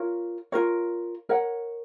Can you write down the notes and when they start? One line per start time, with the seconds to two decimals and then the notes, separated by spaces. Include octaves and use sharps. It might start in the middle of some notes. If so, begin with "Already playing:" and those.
Already playing: F4 A#4 C#5
0.52 F4 A#4 C#5
1.29 A#4 C#5 F#5